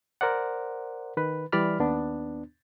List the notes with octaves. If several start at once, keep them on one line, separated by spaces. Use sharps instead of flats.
A#4 C5 D5 F#5
D#3 B4
E3 G3 D5 B5 F6
D#2 B3 D4